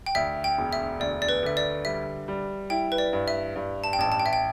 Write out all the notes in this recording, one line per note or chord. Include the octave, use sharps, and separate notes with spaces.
G5
D2 E5
G5
E1
E5
D2 D5
D5
B4
D3 E5
D5
G3 E5
G3
E4 G5
B4
D5
G2
E5
G2
A5
G5
A1 A5
A5
G5
E5
G5